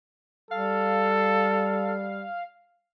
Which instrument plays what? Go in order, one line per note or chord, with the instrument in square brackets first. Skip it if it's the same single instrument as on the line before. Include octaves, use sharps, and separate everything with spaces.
[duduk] G3 [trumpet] A4 [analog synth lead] F5